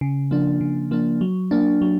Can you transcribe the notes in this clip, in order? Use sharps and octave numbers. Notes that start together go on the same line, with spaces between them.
C#3
F3 A#3 D4
C#3
F3 A#3 D4
F#3
A#3 D4
F#3